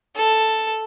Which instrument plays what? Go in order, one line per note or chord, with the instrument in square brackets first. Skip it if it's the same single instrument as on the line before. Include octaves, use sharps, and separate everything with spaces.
[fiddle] A4